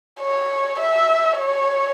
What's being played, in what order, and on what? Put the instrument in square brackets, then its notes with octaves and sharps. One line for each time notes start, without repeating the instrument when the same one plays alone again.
[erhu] C#5
E5
C#5